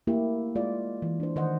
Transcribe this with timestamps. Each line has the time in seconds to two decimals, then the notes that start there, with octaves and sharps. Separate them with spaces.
0.07 A3 A#3 E4 G4
0.55 G#3 F4 D5
1.02 E3
1.20 D4 C5
1.36 D#3 C5 D#5 F#5